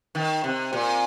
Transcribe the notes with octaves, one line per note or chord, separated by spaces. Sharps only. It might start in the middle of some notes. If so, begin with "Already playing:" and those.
D#3
C3
A#2